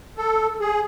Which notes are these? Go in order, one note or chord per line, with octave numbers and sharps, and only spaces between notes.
A4
G#4